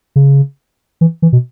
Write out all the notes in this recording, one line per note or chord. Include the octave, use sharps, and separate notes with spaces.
C#3
E3
E3
B2